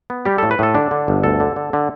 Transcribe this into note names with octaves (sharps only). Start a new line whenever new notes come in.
B3
G3 G4
A2 A4
B4
A2 A4
D3 D4
D3
G1
D2 A4
D3
D3
D3